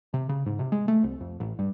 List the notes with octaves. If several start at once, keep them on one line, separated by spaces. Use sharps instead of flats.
C3
C#3
G#2
C3
G#3
A3
C2
F2
A1
G2